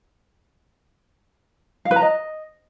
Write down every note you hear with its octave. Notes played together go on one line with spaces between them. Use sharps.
F5
B4
A#5
D#5